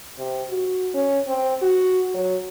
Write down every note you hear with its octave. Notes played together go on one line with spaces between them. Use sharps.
C3
F#4
C#4
C4
F#4
F#3